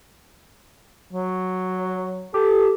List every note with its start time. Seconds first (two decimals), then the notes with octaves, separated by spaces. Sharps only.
1.13 F#3
2.34 G4 A4